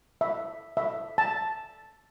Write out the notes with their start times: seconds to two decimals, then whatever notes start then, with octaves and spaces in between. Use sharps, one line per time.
0.21 E5
0.77 E5
1.18 A5